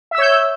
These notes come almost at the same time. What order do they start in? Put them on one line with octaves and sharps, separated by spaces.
E5 E6 C#5 G6